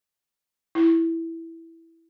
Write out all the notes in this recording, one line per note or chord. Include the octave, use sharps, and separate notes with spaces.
E4